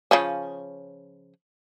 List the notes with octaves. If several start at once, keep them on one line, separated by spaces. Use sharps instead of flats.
C#3 F3 C#4